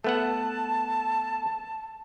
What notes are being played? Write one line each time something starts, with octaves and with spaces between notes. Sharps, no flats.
A3 B3 F#5 A5